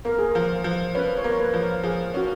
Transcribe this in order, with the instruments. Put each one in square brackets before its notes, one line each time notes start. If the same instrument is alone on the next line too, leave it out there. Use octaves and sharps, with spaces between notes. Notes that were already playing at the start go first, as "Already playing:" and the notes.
[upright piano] A#3 [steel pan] A#4
[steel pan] G#4
[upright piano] F3 [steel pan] A#4
[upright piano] F3
[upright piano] C#4 [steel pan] B4
[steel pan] C#5
[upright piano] A#3
[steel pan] C#5
B4
[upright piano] F3
[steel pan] A#4
[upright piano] F3 [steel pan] G#4
[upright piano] C#4 [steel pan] F#4